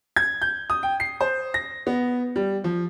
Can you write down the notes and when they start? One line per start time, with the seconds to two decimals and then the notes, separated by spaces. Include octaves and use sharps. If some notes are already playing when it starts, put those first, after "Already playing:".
0.16 G#6
0.42 G6
0.70 D#6
0.83 G5
1.00 C7
1.21 C5
1.54 A#6
1.87 B3
2.36 G3
2.64 F3